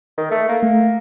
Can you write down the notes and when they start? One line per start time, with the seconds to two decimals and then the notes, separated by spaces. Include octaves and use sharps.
0.17 D#3
0.31 A3
0.49 A#3
0.63 A3